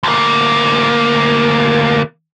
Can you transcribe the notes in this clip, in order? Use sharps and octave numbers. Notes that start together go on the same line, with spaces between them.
D2 A#3